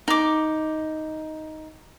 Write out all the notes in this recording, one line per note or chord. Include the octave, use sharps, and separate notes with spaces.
D#4 D6